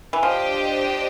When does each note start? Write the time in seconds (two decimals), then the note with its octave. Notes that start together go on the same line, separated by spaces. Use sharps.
0.13 E3
0.23 F3 D4 G4 C5 D#5 G5